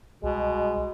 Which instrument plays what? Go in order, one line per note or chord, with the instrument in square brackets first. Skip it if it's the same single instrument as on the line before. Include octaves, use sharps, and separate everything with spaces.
[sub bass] C2 [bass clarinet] B2 [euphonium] G#3